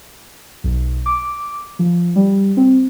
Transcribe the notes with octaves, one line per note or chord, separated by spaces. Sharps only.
B1
D6
F3
G3
C4